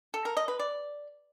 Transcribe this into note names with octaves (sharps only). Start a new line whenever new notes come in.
A4
A#4
D#5
B4
D5